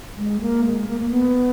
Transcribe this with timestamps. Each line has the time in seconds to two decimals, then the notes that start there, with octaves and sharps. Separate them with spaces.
0.17 G#3
0.40 A#3
0.65 G#3
0.87 A#3
1.00 A#3
1.10 B3